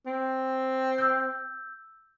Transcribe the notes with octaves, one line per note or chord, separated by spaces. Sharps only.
C4
E6 G6